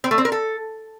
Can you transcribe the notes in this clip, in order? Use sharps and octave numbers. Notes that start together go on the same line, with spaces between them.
C4
A3
C4
A#4
A4